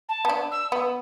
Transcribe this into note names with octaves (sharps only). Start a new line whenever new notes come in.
A5
B3
D4
E6
B3